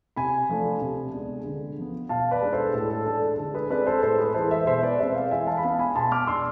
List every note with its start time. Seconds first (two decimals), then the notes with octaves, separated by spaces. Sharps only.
0.16 C3 G#5 B5
0.49 F3 A3 D4
0.82 C3
1.13 G#3 B3 D4
1.45 D3
1.78 F3 B3
2.09 B2 F5 A5
2.31 B4 D5
2.42 G#3 D4
2.53 A4 C5
2.74 A2 A4
2.90 A4
3.06 G#3 D4 A4
3.22 A4
3.38 D3 A4
3.54 G#4 B4
3.70 G#3 C4 B4 D5
3.86 A4 C5
4.02 A2 A4 C5
4.18 G#4 B4
4.34 E3 G#3 A4 C5
4.51 C5 E5
4.67 B2 C5 E5
4.83 B4 D5
4.99 G#3 C4 C5 E5
5.15 D5 F5
5.31 E3 E5 G#5
5.47 F5 A5
5.58 B5
5.63 G#3 B3 D4 F5 A5
5.79 G#5 B5
5.95 B2 A5 C6
6.12 D6 F6
6.27 G#3 D4 C6 E6